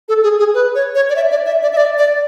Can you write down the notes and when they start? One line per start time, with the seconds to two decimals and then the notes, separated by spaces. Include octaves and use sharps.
0.09 A4
0.23 G#4
0.39 G#4
0.54 B4
0.75 C#5
0.95 C#5
1.10 D5
1.16 E5
1.31 D5
1.46 E5
1.63 D5
1.73 E5
1.77 D5
1.98 D5